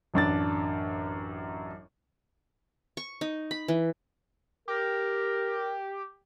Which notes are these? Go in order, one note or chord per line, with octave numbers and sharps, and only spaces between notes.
A1 F#2 D4 A6
C#6
D#4
B5
E3
G4 A#4